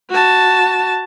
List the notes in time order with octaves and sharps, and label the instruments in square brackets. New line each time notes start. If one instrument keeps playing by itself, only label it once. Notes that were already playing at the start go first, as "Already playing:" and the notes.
[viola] F#4 A5